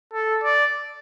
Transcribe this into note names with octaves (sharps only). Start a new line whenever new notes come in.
A4
D5